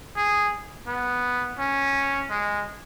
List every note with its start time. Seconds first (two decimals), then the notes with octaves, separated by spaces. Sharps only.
0.17 G#4
0.87 B3
1.59 C#4
2.30 G#3